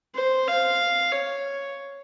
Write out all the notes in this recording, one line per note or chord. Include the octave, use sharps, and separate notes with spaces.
C5
F5
C#5